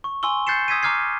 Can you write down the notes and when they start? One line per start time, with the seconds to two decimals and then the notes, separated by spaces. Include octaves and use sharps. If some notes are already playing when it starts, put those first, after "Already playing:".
0.04 C#6
0.23 G#5 C6 C#6 E6 G7
0.47 F#6 G6 A6 C7 C#7 E7
0.68 D#6 E6 G#6 B6 C7 D#7
0.83 A#5 D6 F6 G#6 C7